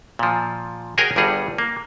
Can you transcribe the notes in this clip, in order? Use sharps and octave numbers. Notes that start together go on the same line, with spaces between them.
A#2 F3
F#4 G#4 A#4 C#5 G5 G#5
G1 G2 G3 G#4 F#5
A#3